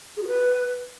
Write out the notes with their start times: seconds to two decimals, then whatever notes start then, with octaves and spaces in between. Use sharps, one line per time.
0.16 G#4
0.21 F#4
0.27 B4